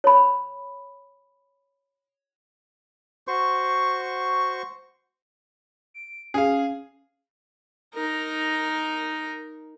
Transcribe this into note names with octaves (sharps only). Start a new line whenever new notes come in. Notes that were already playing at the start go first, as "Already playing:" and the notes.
C#5 B5
F#4 C5 C#6
D7
C#4 G#4 F5
D#4 A#4